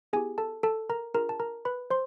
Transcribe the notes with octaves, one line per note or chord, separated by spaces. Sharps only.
B3 E4 G4 G#4 G#5
A4 A5
A4 A5
A#4 A#5
D4 F4 G#4 A#4 A#5
A5
A#4 A#5
B4 B5
C5 C6